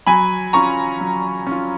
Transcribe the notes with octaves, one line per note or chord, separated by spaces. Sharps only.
F#3 G#5 B5
C#4 F4 A#5 C#6
F#3
C#4 F4